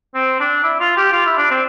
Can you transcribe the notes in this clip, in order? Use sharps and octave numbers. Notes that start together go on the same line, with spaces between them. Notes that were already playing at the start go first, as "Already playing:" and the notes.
C4
D4
E4
F4
G4
F4
E4
D4
C4